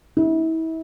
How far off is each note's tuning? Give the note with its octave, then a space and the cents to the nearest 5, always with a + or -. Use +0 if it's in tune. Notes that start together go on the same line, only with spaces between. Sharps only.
E4 -35